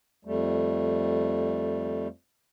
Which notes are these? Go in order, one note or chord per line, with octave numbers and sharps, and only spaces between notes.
F2 G3 A3